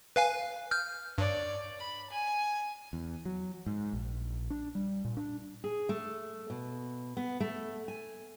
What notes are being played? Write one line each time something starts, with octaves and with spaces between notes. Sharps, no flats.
B4 F5 G#5
F6 G6
G2 C#5 D5
B5
G#5
E2
F#3
G#2
A#1
D4
G3
A#2
D4
G#4
A3
B2
B3
A3
G#5